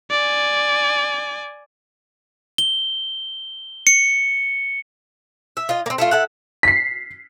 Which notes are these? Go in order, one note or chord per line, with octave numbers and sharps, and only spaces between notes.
D5 G#5
G7
C#7
E5
F4 D#5
A#3 C4
A3 E4 F4
E4 A4 F#5
B6 C7